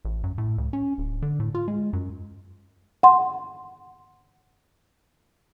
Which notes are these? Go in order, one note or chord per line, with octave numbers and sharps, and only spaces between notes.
A1
F#2
A2
C#2
C#4
D1
D3
A2
F4
G#3
F#2
F#5 C6